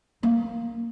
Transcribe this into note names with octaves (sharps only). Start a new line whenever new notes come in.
A#3